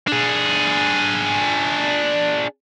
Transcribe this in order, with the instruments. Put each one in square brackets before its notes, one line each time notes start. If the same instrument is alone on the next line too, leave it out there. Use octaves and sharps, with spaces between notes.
[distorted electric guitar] D4 G#4